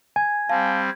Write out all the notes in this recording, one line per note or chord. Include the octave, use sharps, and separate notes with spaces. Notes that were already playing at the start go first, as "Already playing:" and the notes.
G#5 G#6
G3 C4 F5 A5